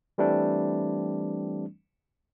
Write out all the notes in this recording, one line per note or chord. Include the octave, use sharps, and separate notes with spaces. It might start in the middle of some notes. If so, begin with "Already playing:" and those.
E3 G3 A3 C4 D4